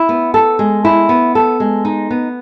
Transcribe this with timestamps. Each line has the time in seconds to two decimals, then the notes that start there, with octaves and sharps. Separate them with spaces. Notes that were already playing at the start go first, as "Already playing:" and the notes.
Already playing: E4
0.09 B3
0.34 A4
0.59 G#3
0.85 E4
1.09 B3
1.35 A4
1.60 G#3
1.85 D#4
2.11 B3